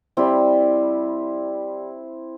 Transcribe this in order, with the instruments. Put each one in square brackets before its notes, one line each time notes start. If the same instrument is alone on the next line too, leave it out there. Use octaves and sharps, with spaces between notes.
[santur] G3 C4 E4